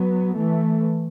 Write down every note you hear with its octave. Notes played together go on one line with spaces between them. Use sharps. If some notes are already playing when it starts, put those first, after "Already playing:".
Already playing: F#3 B3
E3 A3